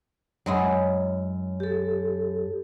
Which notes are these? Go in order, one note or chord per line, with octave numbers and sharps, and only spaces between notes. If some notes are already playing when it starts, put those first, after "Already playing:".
F#2 F#3 G#3 E4
G4 A4